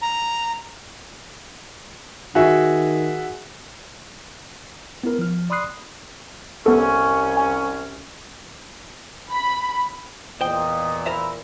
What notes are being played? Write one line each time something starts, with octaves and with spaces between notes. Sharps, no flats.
A#5
D#3 F#4 G#4 E5
B3 E4 A#4
F3 F6
D5 B5 C6 D#6 F#6 C7
C2 B3 C#4 A4
G#5
B5
E2 A#2 C5 D#5 G5
E4 A#4 C5 E5